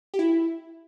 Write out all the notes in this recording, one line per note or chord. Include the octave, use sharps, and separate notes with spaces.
G4
E4